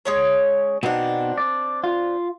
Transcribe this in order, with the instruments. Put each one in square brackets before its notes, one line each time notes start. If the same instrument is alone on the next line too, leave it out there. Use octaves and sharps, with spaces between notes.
[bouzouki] G#3 C#4 C#5
[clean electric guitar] B2 B3 D#4 [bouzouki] C4 D4
[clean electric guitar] D5
F4